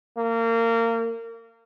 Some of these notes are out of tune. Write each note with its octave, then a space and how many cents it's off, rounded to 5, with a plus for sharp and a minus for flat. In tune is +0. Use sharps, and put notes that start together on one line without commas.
A#3 -25